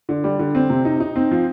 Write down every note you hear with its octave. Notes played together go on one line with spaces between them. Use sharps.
D3
G3
D3
C4
C3
D#4
D#4
C4
F3